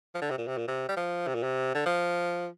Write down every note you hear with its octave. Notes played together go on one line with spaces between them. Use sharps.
F3
D3
C3
A#2
C3
A#2
C3
G3
F3
C3
A#2
C3
D3
F3